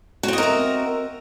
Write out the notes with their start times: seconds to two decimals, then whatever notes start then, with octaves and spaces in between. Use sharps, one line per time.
0.23 F#4
0.28 C4
0.33 D#5
0.38 A#4
0.43 E5